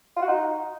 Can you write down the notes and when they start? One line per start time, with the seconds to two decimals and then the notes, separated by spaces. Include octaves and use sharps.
0.16 F4
0.22 F#4
0.27 D#4